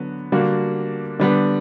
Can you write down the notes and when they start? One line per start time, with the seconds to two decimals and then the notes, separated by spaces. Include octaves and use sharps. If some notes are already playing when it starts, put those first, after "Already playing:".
Already playing: D3 F#3 B3 F#4
0.32 D3 G3 A#3 D4 F#4
1.19 D3 G3 B3